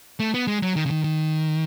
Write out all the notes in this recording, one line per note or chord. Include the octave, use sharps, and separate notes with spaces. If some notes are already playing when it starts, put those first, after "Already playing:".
A3
B3
G#3
F#3
D#3
C#3
D#3
D#3